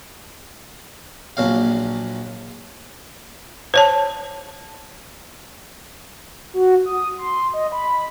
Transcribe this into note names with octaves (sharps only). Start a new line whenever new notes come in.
A#1 F#3 F5
C5 C#5 A5
F#4
D#6
C6
D#5
B5